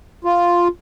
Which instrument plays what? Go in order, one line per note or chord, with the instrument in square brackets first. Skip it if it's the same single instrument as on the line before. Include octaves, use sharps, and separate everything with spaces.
[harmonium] F4